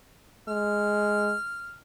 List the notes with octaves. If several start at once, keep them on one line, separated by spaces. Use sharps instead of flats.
G#3 F6